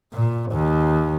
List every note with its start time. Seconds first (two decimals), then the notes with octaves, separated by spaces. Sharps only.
0.13 A#2
0.52 D#2